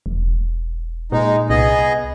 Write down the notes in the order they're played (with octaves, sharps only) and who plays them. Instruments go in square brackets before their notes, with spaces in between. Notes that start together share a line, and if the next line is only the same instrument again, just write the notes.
[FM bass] E1
[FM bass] A#2 [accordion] G#3 D#4
[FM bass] C2 [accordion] B3 G#4 D#5